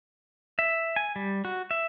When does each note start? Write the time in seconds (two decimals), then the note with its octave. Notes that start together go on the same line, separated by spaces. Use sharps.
0.59 E5
0.96 G#5
1.16 G3
1.45 F#4
1.71 E5